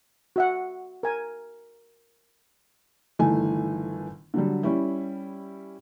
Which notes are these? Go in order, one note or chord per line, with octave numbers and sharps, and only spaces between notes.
F#4 E5 F#5
A#4 G#5
G1 D#3 E3 A3 G#5
D3 F#3 G3
G3 C#4 E4